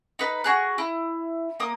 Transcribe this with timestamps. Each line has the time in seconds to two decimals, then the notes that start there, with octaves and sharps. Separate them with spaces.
0.19 D#4 B4
0.44 F#4 G#4 F#6
0.78 E4
1.60 A#3 D#6